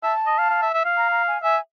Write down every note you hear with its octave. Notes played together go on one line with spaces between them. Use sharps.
E5 A5
D#5
F5
F5
E5
E5
F5
A#5
A#5
G#5
E5 G#5